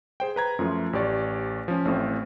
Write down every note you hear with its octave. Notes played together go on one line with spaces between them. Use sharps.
G#4 C5 G5
B4 A#5 G#6
F#2 F3 A3 F4
A1 G4 D5 C#6
F3 C#4
A1 A2 C4